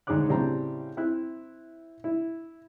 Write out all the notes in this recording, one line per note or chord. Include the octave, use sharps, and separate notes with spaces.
D2 G#2 G#4 C#5 D6 F#6
A2 C#3 G3 C4 D4 A#5
C4 E4 E5 F#6
E4